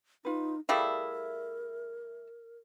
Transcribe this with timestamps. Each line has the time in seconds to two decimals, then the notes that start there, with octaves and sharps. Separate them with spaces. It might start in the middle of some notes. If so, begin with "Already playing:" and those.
0.25 D#4 F4 B4
0.69 G3 A3 E4 G#4 A#4 D5 F5